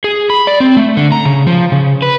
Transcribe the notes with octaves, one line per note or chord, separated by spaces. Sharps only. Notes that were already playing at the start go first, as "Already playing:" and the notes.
G#4
B5
D5
C4
A3
D3
A#5
C#3
F3
C#3
B4